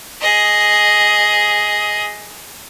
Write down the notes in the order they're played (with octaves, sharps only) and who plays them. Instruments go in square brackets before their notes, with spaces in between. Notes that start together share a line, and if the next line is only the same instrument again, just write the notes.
[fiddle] G#4 D#5